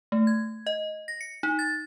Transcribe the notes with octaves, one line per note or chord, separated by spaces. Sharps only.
A3
G#6
D#5
A#6
C#7
D#4
A6